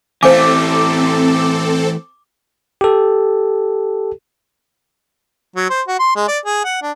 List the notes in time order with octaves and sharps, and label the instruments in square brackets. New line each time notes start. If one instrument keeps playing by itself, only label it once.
[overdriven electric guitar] E3 A3 [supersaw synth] C4 A4 [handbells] C5 F5 G#5 [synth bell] D6
[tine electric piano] G4 A4
[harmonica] F#3
C5
F#4
C6
G#3
D5
G#4
F#5
D4